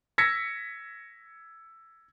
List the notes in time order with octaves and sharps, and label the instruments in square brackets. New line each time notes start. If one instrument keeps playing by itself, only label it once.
[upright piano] E6 G#6 A#6 B6 C#7